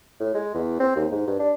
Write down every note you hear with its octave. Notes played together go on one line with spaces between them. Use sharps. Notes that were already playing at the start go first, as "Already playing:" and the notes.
A2
G#3
E2
C4
D#2
G#2
G2
D4